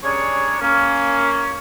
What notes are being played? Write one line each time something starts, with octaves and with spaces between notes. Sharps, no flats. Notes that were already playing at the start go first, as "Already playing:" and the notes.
G3 C#4 D4 G#4 A#4 C#5
A#3 C#4